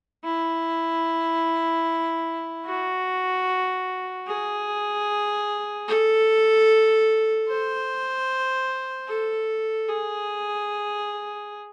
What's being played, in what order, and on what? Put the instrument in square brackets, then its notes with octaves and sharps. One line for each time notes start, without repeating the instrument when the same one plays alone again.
[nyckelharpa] E4
F#4
G#4
A4
C5
A4
G#4